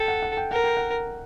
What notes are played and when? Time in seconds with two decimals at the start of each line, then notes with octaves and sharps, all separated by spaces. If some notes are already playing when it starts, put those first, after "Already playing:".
Already playing: A4 G5
0.08 F#5
0.22 F#5
0.37 G5
0.51 A#4 F#5
0.64 G5
0.77 F#5